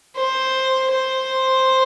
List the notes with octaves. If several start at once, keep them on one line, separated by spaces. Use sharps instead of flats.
C5
C5